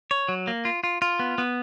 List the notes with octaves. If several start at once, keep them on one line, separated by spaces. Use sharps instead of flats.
C#5
F#3
A#3
F4
F4
F4
B3
B3